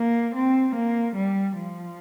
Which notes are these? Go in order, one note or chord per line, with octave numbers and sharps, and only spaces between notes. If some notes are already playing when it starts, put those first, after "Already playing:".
Already playing: A#3
C4
A#3
G3
F3